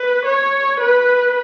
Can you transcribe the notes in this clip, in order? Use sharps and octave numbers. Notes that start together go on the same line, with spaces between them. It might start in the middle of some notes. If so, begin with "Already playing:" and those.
Already playing: B4
C#5
B4